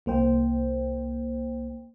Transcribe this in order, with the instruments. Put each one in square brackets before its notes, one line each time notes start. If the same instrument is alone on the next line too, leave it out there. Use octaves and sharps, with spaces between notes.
[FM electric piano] C2 A#3 C5 G5